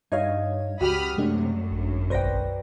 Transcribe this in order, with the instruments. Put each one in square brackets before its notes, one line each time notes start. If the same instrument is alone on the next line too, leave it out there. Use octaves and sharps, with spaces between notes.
[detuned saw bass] G2 [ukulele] D#4 D#5 F5 [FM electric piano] C#5 G#6
[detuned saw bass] C#2 [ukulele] F#4 G4 G5 [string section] B5 D#6 F6
[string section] F#2 [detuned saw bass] C3 [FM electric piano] G#3 A3 D4
[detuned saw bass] G#1
[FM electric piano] B1 C5 A#6 [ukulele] B4 D5 G5